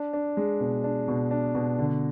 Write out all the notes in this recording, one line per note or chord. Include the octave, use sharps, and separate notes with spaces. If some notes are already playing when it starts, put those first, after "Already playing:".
Already playing: D4
D4
G#3
B2
D4
B2
D4
B2
D3